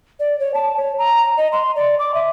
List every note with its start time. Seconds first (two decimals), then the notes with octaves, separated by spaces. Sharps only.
0.20 D5
0.39 C#5
0.54 A5
0.77 C#5
0.98 A#5
1.37 D#5
1.52 C6
1.76 D5
1.99 D6
2.14 E5